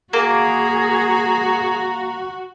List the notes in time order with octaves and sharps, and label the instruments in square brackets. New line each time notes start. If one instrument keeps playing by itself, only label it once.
[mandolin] A#3 [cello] F#4 [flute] G#4 [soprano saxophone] A#5